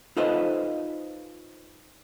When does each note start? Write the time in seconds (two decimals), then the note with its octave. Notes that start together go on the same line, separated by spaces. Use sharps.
0.17 D#4 F4 A4 B4 C5 D#5